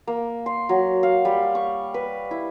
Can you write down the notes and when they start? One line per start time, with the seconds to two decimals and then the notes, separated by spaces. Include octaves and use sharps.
0.07 A#3
0.46 C6
0.69 F#3
1.03 F5
1.25 G3
1.55 C#6
1.94 B4
2.31 E4